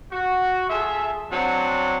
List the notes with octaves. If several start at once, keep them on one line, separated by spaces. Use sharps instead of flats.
F#4
F4 G#4 A4 E5
F#3 C4 D4